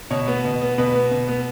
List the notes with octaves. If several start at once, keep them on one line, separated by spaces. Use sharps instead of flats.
B2 C#5
B3
B2
B3
B2 B4
B3
B2
B3